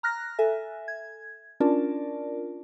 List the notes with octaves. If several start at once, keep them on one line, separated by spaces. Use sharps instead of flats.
A#5 F6 F#6 A#6
A4 E5 G#5
G#6
C#4 D4 F4 A#4 D5 A5